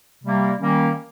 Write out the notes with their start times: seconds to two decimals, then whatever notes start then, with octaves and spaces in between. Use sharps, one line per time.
0.24 C3 G3 A#3
0.60 D#3 G3 A#3 C#4